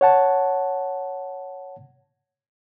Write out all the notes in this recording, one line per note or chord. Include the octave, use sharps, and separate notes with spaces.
C#5 F#5 A5